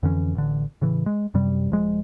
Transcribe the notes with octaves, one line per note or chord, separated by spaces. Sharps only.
F2 D3 E3 C#4
A1 D3
A2 C#3 E3
G#3
F#2 C3 G3
D#1 F3 G#3